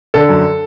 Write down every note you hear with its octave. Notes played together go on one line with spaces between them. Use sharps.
D3 A4
F#2